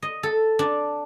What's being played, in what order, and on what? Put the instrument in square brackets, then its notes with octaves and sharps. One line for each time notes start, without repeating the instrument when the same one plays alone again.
[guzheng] D#5
A4
D4